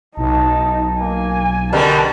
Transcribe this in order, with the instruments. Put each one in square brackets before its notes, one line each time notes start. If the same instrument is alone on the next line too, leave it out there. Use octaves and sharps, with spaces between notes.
[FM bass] B1 [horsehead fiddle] D#4 [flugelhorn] A5
[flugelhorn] A#3 [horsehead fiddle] G#5
[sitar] B2 D3 G3 [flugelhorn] A#4 [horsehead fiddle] A5